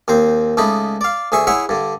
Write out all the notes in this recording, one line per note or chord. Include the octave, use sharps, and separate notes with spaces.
D#2 C4 C5
C#2 A3 D#4 B5
D5 F5
D2 G#4 E5 C#6
E4 G#4 C#5 E5 F#5
G2 D3